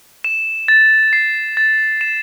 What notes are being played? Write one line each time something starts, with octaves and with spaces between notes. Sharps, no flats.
E7
A6
C7
A6
E7